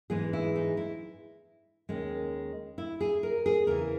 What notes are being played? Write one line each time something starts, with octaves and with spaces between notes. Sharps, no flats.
G#2 E3 G#3 B3 G#4
E4
D#4
E4
D#2 D#3 G#3 C#4
E4
G#4
A#4
G#4
E2 C#3 E3 A#4